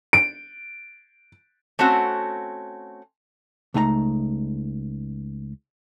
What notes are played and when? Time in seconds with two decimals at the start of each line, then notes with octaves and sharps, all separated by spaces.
0.13 D7
1.79 A3 C4 C#4 F#4
3.74 C#2 A3 D#4 G#5 A#5